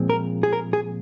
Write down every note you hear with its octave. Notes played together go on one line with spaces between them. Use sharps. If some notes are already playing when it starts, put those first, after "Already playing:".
Already playing: A#2 F3 G#3 C4
A#4
G#4
A#4
G#4